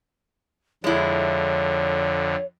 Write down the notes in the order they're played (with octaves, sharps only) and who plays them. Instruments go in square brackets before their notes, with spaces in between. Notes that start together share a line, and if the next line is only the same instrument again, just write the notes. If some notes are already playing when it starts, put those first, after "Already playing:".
[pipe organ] F2 D3 [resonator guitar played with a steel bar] G#3 E4 [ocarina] C#5